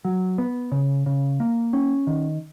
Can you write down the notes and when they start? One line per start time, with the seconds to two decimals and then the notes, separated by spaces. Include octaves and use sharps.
0.05 F#3
0.38 B3
0.72 C#3
1.06 C#3
1.40 A#3
1.73 C#4
2.07 D#3